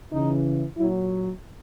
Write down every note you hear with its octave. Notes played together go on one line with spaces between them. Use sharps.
C#3 E3 D#4
A#2 F#3 E4